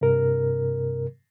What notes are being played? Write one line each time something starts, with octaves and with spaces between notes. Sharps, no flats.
G2 C3 A#4